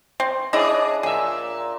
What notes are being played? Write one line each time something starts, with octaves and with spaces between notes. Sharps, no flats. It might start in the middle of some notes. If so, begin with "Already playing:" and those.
C4
C#4 D4 E4 G#4 D#5
A#2 G#4 E5